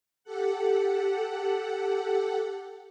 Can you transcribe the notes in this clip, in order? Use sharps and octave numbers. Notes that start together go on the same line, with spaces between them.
G4 A4 F#5